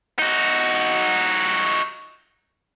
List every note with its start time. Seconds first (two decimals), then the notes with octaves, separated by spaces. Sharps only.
0.19 D#4 F#4